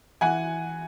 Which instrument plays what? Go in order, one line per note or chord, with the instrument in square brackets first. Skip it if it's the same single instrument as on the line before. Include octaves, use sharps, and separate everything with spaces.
[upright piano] E3 F#5 G#5